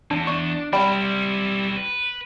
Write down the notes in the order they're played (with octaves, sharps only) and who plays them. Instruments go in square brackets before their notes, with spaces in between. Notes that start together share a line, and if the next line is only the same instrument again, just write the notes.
[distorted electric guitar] E2 [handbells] D4
[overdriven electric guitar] D4 [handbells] C#6
[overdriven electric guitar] G3 [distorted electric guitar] C4 E4 [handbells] D5 G5 B5
[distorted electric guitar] B4